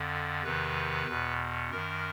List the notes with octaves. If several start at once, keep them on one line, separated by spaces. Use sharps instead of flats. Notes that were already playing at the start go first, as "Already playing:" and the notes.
Already playing: F2 D3
E2 C3 D#3 B4
E2 B2
F#2 D#3 A#4